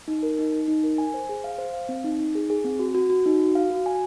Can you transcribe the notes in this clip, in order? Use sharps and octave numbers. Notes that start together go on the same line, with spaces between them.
D#4
A#4
D#4
D#4
D#4
A#4
G#5
C5
G#4
F5
C5
F5
C4
D#4
D#4
G#4
G#4
C4
F#4
F#4
F#4
D#4
F#4
F5
F#4
G#5